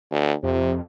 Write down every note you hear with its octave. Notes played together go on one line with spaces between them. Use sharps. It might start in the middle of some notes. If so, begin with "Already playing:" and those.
D2
F2 C3